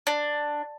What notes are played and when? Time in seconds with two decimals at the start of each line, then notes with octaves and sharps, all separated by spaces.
0.07 D4